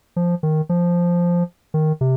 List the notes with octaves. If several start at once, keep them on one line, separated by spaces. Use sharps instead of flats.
F3
D#3
F3
D#3
C3